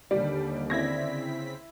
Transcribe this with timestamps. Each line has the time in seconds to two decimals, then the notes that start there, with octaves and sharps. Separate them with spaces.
0.11 D#2 D3 G3 D5
0.70 C#3 C4 E4 G#6 A#6 B6